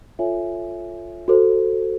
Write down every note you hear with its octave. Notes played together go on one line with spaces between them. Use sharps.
F4 A4 C#5 E5 G#5
F#4 A4 C5